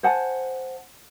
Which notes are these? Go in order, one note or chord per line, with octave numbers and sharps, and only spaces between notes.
C5 F#5 G#5 A5